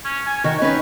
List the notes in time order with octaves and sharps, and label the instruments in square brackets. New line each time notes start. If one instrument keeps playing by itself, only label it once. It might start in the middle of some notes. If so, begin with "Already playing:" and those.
[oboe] C#4
G#5
[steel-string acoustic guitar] D#3 [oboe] F#4
[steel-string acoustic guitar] C#4 D#4 [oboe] B4